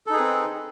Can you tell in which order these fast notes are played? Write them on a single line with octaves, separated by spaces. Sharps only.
A4 D#4 G#4 B4 C4